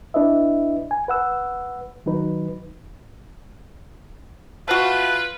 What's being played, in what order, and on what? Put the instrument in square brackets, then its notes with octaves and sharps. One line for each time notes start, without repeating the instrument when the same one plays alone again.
[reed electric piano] D4 E4 B4 D#5 E5
G#5
B4 F#5 E6
D#3 F#3 D#4 B4
[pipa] A3 F#4 [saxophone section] F4 B4